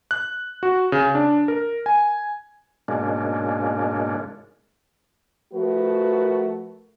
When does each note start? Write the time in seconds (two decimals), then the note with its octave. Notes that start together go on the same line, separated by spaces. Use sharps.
0.11 F#6
0.63 F#4
0.92 C#3
1.15 D4
1.48 A#4
1.86 G#5
2.88 G#2 B2 G#3 A#3 C#4 D4
5.53 F3 A3 F#4 A#4 B4